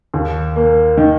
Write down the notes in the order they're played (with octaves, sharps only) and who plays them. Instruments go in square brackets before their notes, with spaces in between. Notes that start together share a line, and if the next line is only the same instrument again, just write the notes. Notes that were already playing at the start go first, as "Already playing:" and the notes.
[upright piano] D#2
A#3
D#3